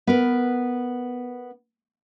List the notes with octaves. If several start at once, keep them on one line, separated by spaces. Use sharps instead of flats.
B3 A#4 B4